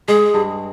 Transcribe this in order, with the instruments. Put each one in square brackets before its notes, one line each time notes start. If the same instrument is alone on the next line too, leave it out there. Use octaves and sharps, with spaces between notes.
[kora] G#3 [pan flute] G#4
[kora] G2